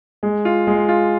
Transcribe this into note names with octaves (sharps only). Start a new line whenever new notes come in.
G#3
F4
G#3
F4